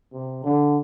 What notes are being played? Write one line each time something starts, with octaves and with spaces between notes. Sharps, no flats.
C3
D3